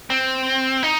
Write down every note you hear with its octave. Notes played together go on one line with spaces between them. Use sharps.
C4
D#4